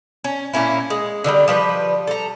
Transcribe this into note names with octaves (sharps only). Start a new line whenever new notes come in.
C#4
A#2 A#3 C#4 E4
G#3
D3 D#3 F3 G3
F3 G3 B4
A4 A#5